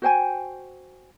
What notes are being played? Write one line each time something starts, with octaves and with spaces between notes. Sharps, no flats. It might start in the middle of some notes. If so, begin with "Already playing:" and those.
F#4 C5 G5 G#5